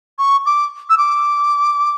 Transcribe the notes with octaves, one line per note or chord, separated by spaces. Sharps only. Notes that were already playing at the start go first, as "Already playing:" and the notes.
C#6
D6
E6
D6